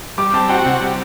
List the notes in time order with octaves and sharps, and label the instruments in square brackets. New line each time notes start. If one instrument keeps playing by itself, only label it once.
[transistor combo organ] G3 [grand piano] D6
[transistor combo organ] C4 [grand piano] A5
[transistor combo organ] F#4 [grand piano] G5
[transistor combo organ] C3
G3